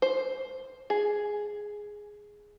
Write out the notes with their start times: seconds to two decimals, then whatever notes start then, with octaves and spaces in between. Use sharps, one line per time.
0.02 C5
0.90 G#4